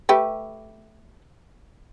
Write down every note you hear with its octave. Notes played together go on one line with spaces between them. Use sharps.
A3 G4 B4